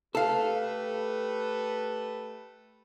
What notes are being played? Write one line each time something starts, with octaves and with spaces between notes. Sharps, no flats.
A3 G4 A4 B4 F5